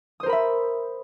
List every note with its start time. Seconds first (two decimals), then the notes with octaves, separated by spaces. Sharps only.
0.20 D#6
0.23 C5
0.26 A#4
0.29 B5
0.33 E5